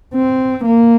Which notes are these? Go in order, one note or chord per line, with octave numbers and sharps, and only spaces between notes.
C4
A#3